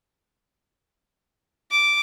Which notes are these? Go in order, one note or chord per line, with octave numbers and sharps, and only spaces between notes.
D6